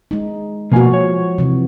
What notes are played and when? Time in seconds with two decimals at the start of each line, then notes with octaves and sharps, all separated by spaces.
0.11 G#3 D#4
0.72 B2 F3 A#3 F#4 G#5
0.94 C#5
1.38 C3 E3